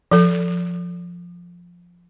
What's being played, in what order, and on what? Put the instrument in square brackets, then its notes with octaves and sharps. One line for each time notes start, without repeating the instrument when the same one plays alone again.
[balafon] F3 A4